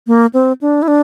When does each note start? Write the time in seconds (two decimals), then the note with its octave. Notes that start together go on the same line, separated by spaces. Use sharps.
0.07 A#3
0.34 C4
0.61 D4
0.82 E4
0.88 D4